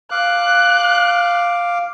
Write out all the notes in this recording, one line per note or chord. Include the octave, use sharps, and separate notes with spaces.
F5 D6 F#6